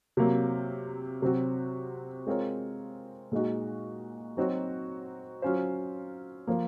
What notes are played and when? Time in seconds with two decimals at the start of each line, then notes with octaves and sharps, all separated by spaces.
0.17 C3 F#3 A#3
1.22 C3 F#3 C4 F#4
2.27 G#3 C4 F4 A#4 C#5
3.32 A#2 G#3 D#4 F#4
4.37 F#3 C4 D#4 F#4 C#5
5.42 F#3 C#4 F4 C5
6.47 F3 A#3